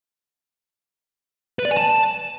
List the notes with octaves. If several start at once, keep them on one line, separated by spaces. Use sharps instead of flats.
B4
D5
G#5
A5